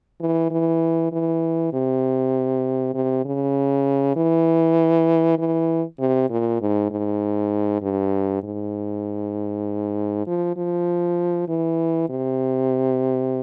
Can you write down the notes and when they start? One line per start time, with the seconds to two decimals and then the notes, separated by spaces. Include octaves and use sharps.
0.21 E3
0.51 E3
1.12 E3
1.73 C3
2.94 C3
3.25 C#3
4.17 E3
5.39 E3
6.00 C3
6.30 A#2
6.61 G#2
6.91 G#2
7.83 G2
8.43 G#2
10.27 F3
10.57 F3
11.48 E3
12.10 C3